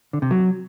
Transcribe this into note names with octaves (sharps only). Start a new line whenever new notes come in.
D3
C3
F#3